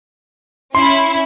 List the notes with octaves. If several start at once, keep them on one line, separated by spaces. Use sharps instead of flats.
C#4 E4 C6